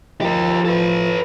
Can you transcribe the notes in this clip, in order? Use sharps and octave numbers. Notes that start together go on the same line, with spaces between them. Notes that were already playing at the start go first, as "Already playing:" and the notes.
F3 G4 A#4
A4 B4